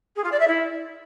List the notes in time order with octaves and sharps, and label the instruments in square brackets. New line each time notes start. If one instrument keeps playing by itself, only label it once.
[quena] G#4
F4
D5
E5
E4